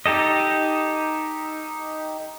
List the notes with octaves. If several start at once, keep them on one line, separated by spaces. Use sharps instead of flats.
D#4 G4 A4 D#5